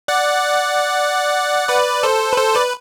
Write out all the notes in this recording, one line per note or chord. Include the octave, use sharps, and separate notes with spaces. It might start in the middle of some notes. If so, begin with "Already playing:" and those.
D5 F#5
B4 D5
A4 C5
B4
A4 C5
B4 D5